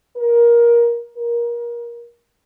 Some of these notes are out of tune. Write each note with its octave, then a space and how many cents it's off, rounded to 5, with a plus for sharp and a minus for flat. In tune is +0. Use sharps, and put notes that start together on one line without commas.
A#4 +20
A#4 +25